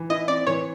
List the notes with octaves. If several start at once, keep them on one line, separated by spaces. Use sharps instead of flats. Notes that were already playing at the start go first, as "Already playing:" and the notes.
Already playing: E3
E4 D#5
C4 D5
E3 C#5